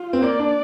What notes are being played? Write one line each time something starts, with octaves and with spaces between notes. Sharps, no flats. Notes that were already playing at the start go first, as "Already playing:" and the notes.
Already playing: F4
C4
A#3 D5
D4